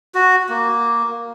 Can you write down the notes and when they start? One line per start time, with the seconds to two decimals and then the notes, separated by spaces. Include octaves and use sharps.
0.15 F#4
0.49 A#3